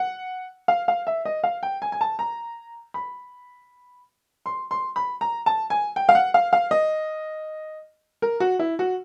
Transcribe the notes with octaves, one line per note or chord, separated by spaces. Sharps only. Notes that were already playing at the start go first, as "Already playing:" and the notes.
Already playing: F#5
F5
F5
E5
D#5
F5
G5
G#5
G#5
A5
A#5
B5
C6
C6
B5
A#5
A5
G#5
G5
F5
F#5
F5
F5
D#5
A#4
F#4
E4
F#4